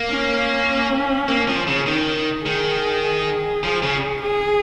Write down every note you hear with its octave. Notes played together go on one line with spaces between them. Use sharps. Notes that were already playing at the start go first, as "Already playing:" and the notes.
Already playing: A#3
C#4
A#3
F3
C#3
D#3 D#4
D#4
D#3 G#4
F3
C#3
G#4